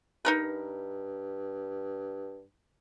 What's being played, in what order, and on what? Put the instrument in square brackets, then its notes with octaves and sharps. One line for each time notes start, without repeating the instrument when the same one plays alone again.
[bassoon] G2 [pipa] D#4 A#4 B4